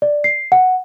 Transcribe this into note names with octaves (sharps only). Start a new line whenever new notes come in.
D5
C7
F#5